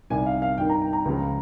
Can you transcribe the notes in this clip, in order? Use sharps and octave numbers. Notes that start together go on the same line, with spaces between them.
C2 C3 D#3 G#5
F5
F5
G2 D#3 G5
A#5
G5
A#5
C#2 C#3 F3